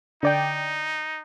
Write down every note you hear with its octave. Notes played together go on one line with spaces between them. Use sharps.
D3 D#4 D5 G5